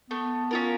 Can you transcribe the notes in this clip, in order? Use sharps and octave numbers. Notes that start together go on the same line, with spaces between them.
A3 B3
C#4 F4 A#4